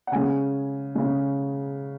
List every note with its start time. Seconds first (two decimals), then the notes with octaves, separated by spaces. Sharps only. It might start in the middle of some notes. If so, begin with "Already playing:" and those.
0.07 F#5
0.12 C#3 G#3 G#5
0.95 C#3 G#3